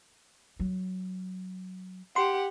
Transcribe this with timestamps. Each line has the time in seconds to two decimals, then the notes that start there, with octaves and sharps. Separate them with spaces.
0.60 F#3
2.16 G4 F#5 C6